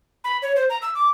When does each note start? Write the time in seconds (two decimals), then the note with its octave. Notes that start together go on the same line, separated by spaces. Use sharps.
0.24 B5
0.42 C#5
0.56 C5
0.70 A#5
0.82 E6
0.95 D6